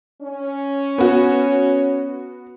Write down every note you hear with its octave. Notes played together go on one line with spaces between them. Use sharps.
C#4
B3 F#4